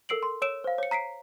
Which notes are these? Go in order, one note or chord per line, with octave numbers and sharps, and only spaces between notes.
A4 A#4 E6 C7 D7 F#7
C6
C#5 E6 D7 E7
C5 F5
C#5 C#7
A#5 B6 C7 D7